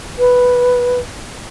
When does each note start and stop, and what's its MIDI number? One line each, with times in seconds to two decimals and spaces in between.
0.19 0.99 71